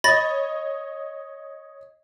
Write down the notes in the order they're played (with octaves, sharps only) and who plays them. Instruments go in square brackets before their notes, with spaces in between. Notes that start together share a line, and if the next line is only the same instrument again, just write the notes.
[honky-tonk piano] C#5 D#5 [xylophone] B5 A6 A#6